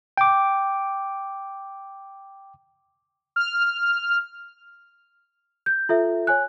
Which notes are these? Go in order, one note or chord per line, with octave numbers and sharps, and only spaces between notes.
G5 D6
F6
G6
F4 A4 E5
C#5 G#5 F#6